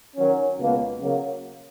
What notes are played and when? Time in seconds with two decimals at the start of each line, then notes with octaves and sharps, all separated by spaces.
0.16 D#3 F#3 C#4
0.58 C#2 B2 A#3
0.99 C#3 F#3 A#3